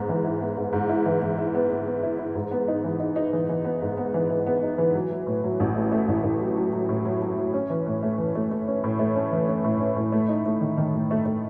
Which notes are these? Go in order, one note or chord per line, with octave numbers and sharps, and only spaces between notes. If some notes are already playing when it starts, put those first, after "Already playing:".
Already playing: G#2 B3
E3
E4
B3
G#2
G#2
E4
E3
E3
E4
B3
B3
B3
E4
E4
G#2
B3
D#4
E3
D#4
D#4
E3
E3
B3
G#2
B3
E3
E3
B3
D#4
E3
F#3
F#3
A2
F#3
A1
A3
A3
A1
A1
F#3
F#3
F#3
A2
F#3
F#3
F#3
C#4
E3
A2
A3
E3
A3
A3
C#4
A2
A3
C#4
E3
C#4
A2
C#4
A2
A3
D#4
A3
D#3
D#3
A3
A3
A3